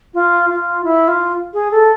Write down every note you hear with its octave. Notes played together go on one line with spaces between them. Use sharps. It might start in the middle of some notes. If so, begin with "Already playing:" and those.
F4
F4
E4
F4
G#4
A4